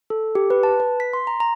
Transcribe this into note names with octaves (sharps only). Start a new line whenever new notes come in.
A4
G4
B4
A5
B4
B6
C6
A#5
A#5